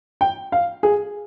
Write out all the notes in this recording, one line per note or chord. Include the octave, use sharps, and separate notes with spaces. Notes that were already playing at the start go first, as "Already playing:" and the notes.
G5
F5
G#4